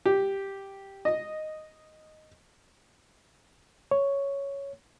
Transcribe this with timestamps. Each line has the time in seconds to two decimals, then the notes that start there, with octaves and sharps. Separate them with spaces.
0.06 G4
1.05 D#5
3.91 C#5